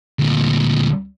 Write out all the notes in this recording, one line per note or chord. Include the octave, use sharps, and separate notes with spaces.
D2 A#2